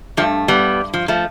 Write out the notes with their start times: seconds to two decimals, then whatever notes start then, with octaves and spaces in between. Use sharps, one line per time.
0.17 G2 F3 A3
0.48 G3 B3
0.94 F3
1.08 F3 A3